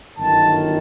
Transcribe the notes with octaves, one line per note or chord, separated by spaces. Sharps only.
G1 F#2 D#3 A5